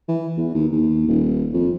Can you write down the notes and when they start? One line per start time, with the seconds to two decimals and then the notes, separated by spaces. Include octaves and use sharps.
0.08 E3
0.38 E2
0.54 D#2
0.72 D#2
1.08 D#1
1.53 F2